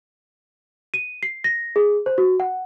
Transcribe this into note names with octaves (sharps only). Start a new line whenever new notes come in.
D#7
C7
A#6
G#4
C5
F#4
F#5